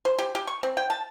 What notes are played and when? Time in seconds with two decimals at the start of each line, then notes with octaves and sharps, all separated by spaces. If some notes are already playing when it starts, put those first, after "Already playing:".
0.05 C5
0.18 G4
0.35 G4
0.47 C#6
0.63 C4
0.77 G5
0.90 A5